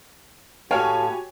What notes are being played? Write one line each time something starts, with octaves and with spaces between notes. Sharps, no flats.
A2 F#4 G4 A4 C#5 F5 G#5